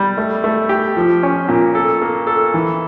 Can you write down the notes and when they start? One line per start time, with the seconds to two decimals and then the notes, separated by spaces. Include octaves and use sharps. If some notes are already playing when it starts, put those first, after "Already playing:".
Already playing: G3
0.18 A3
0.44 A3
0.69 G4
0.97 F3
1.23 C#4
1.48 A#2
1.75 A4
2.01 A#3
2.27 A4
2.54 E3